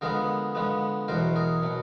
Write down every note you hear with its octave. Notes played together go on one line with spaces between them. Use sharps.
D3 F3 G#3 B3 G#4 A#4
D3 F3 G#3 B3
E2 B2 F#3 A#4 C5
G#4 A#4
B2 F#3